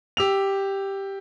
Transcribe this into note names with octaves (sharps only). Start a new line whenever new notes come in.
G4 E6 F7